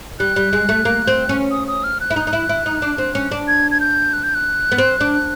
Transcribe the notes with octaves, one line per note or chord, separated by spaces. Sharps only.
G3 F#6
G3
G#3
A3
A#3
C4
C#4
D#6
D#6
F6
F#6
E4
D#4
D#4
E4
E4
D#4
D4
C4
C#4
D4
G#6
G#6
G6
F#6
G6
F#6
B3
C4
D4